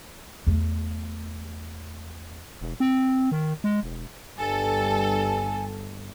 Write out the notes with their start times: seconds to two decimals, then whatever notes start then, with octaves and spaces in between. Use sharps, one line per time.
0.47 E2 A3
2.61 E1
2.80 C4
3.32 D#3
3.64 G#3
3.83 E1
4.39 G1 G2 A4 G#5